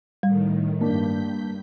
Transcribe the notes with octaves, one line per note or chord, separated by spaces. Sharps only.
A2 D#3 G3
G2 A#3 D4 A#4 G6 B6